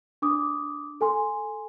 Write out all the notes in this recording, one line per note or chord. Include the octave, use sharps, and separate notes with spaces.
D4 D6 D#6
A4 G#5 C6